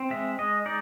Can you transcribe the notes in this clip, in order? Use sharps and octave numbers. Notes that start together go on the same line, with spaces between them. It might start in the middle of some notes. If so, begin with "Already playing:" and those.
Already playing: C4
G#3 E5
G#3 D#5
D#4 D5